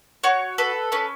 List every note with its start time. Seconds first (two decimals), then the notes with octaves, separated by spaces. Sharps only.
0.23 F#4 C#5
0.58 A4 B4
0.92 C#4 B4